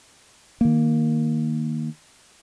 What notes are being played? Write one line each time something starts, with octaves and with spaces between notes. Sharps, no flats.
D#3 A#3